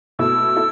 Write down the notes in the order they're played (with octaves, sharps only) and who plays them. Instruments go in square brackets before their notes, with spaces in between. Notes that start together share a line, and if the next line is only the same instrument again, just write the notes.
[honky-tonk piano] B2 A3 E4 A4 [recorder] E6
[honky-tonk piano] E4 A4